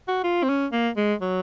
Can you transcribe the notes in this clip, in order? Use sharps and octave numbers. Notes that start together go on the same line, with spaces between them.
F#4
F4
C4
C#4
A#3
G#3
F#3